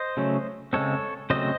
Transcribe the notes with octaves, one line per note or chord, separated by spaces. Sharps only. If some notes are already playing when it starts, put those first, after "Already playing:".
Already playing: C5 D#5
C#3 F#3 A3 C#4
C#3 G#3 C4 A4 C#5
C#3 F#3 A3 C4 C5 D#5